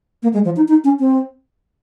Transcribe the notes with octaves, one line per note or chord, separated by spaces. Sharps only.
A#3
G#3
F3
D#4
D#4
C#4
C4